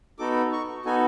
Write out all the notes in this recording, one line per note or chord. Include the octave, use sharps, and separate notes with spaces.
B3 D#4 F#4 A4 D6
C#6
B3 D#4 F#4 A4 G#5